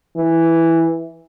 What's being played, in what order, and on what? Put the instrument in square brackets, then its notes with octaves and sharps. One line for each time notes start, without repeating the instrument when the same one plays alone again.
[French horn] E3